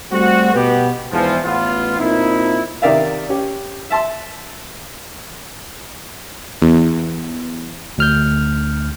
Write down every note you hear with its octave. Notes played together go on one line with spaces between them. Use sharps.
G3 A3 C4 F#4
B2 B3 G4
E2 G#2 B2 E3 F3
A1 B3 F4
A#2 C4 D#4 E4
C3 D#3 A#4 D5 E5 F5
C#4 G4
E5 A5 C6
E2
D2 F6 G6